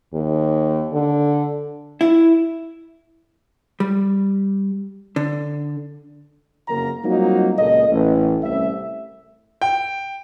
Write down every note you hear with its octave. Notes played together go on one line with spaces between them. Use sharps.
D#2
D3
E4
G3
D3
F#1 F2 C#3 A#3 A#4 A#5
F#3 G3 A#3 C4 D#4 F4
C#2 A#2 A4 A#4 D#5
A1
C2 G3 A3 C#4 E5
G5